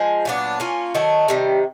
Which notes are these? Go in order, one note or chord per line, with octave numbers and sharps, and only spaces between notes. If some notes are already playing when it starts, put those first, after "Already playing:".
Already playing: F3 G#3
A#2 F#3 B3 D4
A#3 C#4 F4
D#3 F#3 A3
C3 D#3 G3